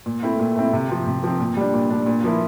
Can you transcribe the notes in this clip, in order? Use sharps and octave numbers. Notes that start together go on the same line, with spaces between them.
A#2
A3 C4 E4
A#2
A3 C4 E4
C3
F3 C4
C3
F3 C4
A#2
G3 D4
A#2
G3 D4
A#2
F3 A#3 E4